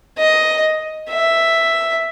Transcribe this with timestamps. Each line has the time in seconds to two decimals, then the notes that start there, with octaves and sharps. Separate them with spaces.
0.18 D#5
1.10 E5